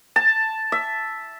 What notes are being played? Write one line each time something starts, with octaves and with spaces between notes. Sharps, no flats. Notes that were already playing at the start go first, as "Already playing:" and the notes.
A5
E5